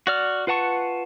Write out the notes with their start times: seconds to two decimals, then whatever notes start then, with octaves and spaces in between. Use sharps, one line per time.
0.07 F#4 D5 F6
0.47 F4 B4 F#5 A5 C#6